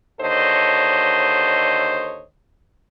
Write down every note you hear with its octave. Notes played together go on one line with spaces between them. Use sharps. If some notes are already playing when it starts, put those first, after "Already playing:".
D#2 D3 A4 C5 C#5 D#5